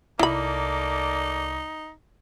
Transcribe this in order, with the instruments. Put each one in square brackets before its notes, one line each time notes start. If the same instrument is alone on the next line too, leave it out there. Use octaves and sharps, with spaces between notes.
[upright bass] C2 [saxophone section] A3 A#3 D5 [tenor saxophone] D#4 [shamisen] E4 B5